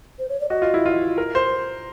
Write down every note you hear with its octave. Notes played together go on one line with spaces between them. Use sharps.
C5
C#5
D5
F#4 D#5
F4
E4
F4
A#4
C5